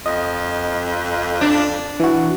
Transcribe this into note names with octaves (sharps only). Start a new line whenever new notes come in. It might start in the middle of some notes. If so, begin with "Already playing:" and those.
F2 D#5
D4
E3 F#4